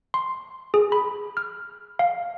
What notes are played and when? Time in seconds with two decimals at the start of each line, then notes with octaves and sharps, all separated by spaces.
0.14 C6
0.74 G#4
0.92 B5
1.37 F6
1.99 F5